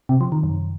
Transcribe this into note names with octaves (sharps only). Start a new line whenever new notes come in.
C3
F3
D#3
F#2